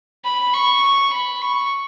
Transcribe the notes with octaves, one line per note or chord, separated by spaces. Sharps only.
B5
C#6
B5
C#6